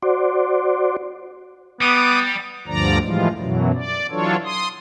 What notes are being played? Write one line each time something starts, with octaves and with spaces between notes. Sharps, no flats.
F#4 C5 D5
G3 B3 D6 D#6
D2 G2 D3 F3 D5 A#5
A2 E3 F3 G3 G#3 F4
F#2 B2 E3 F#3
D5
E3 F#3 D4 F4 A4 C#5
C6 D#6